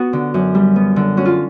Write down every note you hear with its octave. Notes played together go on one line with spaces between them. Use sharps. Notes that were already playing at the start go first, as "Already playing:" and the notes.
Already playing: B3 F#4
D3
F#2
G3
B3
D3
C#4 F#4
F4